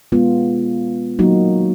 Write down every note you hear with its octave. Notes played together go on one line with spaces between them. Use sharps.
G#3 B3 F4
F#3 A#3 D#4 F#4